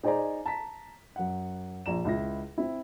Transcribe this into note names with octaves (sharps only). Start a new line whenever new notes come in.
D#4 G#4 C5 D5 G#5 A#5
A5 A#5 B6
F#2 F#5
A#1 A#5 E7
C#2 E4 A#6
C4 E4